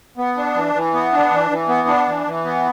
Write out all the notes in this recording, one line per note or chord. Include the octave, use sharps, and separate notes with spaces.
B3
D4
E3
E3
B3
D4
E3
E3
B3
D4
E3
E3
B3